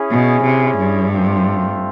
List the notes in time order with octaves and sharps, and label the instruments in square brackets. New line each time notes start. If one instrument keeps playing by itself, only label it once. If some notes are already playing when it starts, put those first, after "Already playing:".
Already playing: [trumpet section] C#4 E4 G#4
[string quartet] B2
C3
G2
[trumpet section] A3 C4 F4